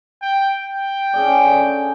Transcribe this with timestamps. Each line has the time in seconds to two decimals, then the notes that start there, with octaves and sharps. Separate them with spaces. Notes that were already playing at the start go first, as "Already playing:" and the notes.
0.22 G5
0.63 G5
1.13 C#4 G#4 D5
1.44 D3 D6